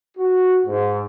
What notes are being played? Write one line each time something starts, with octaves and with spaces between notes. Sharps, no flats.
F#4
G#2